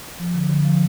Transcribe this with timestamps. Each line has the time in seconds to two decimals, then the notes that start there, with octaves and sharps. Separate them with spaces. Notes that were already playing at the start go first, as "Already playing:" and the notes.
0.19 F3
0.34 D3
0.49 D3
0.65 F3